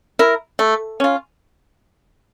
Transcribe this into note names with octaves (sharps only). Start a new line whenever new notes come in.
E4 A#4
A3
C#4 F4